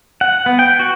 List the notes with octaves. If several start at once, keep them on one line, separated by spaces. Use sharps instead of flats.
F#5
B3
G5
F#4